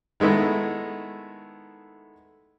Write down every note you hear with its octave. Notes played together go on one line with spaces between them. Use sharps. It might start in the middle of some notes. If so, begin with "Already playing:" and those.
D#3 G#3 A3 B3 E4